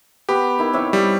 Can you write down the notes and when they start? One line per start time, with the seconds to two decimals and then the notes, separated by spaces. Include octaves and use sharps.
0.29 B3 G4 B4
0.59 D#3 E4
0.73 C3 C#5 E5
0.93 G3